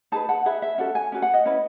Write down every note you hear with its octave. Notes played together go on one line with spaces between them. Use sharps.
D#4 G#4 B4 A5
F#5
D#4 G#4 B4 E5
E5
C#4 F#4 A4 F#5
G#5
C#4 F#4 A4
F#5
D#5
C#4 E4 B4